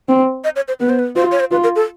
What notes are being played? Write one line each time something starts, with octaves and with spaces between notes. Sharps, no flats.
C4
D#5
C#5
C5
B3 B4
C5
B4
F4 C5
C#5
C5
F4 B4
A#4
A4